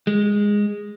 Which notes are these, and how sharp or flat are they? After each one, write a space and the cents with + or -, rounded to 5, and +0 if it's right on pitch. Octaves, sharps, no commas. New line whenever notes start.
G#3 -10